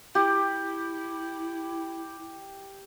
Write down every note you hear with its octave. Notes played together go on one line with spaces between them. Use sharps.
E4 G4